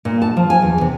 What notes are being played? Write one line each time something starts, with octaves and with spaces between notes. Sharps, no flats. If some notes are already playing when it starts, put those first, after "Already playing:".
A#2
A5
F3
G#5
E2
C3